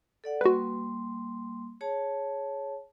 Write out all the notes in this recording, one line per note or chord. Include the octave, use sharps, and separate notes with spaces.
A4 D5 F#5
G3 A#3 F#4 B4 C6
G#4 C#5 A5